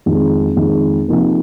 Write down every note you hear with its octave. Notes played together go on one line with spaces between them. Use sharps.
F2 D#3 G#3
F2 D#3 G#3
C3 F3 A#3 D#4